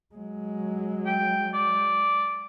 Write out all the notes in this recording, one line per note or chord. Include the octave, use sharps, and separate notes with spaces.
F#3 G#3
G5
D5